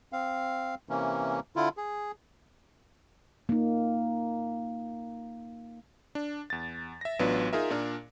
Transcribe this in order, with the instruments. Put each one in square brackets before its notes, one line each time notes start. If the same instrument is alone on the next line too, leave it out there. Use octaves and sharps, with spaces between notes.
[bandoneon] C4 F5
C3 E3 A#3 C#4
D3 E4 F4
G#4
[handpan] A#3 D#4
[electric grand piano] D4
E2 A6
E5 A#6
A1 F#3 B3 D4 F4 B4
D#4 F4 G#4 A#4 E5
A#2 D4 A#4